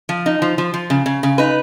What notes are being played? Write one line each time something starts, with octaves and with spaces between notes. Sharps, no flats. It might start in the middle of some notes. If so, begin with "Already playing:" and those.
F3
D#4
F3
F3
F3
C#3
C#3
C#3
D#4 B4